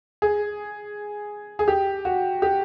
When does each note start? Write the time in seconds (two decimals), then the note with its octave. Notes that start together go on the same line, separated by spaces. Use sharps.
0.22 G#4
1.59 G#4
1.68 G4
2.05 F#4
2.42 G4